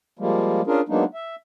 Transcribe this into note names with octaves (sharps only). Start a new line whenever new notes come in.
F3 G3 G#3 A#3
C#4 D4 F4 G#4 A#4
F#3 G#3 A#3 B3 D4 D#4
E5